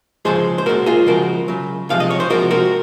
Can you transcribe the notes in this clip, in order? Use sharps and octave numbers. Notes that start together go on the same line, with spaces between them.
C#3 F3 G#3 G#4 C5
C5
A#2 G#3 F#4 A#4
F4 G#4
C#3 F3 G#3 F#4 A#4
C#3 F#3
C3 F3 G#3 F5
D#5
C#5
C5
C3 F3 G#3 F#4 A#4
F#4 A#4